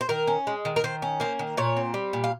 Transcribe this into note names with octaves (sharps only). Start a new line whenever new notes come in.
C5
D#3 A#4
C#4
G#3
D#3
A#4
D#3 C5
C#4
A#3 C5
D#3
A#2 C#5
C4
G3
A#2
F5